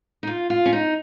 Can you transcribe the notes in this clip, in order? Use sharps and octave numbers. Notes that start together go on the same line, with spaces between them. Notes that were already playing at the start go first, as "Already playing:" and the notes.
D#4
F4
F4
C#4
D#4